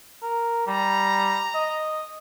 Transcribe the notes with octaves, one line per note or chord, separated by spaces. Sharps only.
A#4
G3 A#5
D#5